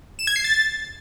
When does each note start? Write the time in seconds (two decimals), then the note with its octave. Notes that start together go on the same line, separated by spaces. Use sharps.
0.19 E7
0.27 G#6
0.36 C7
0.44 A6